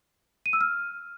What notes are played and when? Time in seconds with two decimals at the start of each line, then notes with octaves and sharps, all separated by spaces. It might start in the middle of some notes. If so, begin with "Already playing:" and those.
0.46 D#7
0.53 E6
0.61 F6